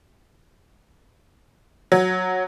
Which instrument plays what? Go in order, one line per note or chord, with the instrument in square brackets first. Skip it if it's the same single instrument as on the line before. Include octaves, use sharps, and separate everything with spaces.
[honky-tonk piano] F#3